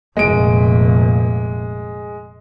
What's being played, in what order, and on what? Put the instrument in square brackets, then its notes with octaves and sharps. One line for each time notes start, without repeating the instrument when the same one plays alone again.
[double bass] F1 A#2 [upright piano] G#3 D7